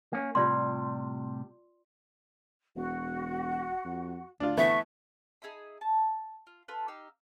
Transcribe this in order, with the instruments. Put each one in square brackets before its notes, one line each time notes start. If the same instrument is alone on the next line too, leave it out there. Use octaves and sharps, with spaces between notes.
[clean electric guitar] A#3 C#4
[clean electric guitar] A2 C3 G3 [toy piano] F4 D5 C6
[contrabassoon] E1 [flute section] F#4 F#5
[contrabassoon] F2
[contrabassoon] D2 [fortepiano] D4 F4
[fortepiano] E3 A3 B3 [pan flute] E5 [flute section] A5 C#6
[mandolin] D#4 G#4 E5 B5
A5
F4
F4 A4 B4
D#4 G4 F5 E6